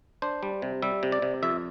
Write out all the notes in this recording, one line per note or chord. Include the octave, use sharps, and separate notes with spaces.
D4 C5
G3
C3
G3 E5
C3
D5
C3
F2 E5